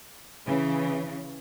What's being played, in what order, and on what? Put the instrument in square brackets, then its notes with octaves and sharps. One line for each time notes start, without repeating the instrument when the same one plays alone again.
[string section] C#3 E3